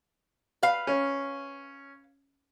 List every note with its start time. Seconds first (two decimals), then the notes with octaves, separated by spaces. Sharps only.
0.63 B4 F5
0.87 C#4